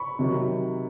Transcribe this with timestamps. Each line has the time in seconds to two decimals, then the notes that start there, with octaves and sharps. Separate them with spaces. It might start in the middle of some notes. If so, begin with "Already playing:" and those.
Already playing: B5 C#6
0.19 C3 D#3 F#3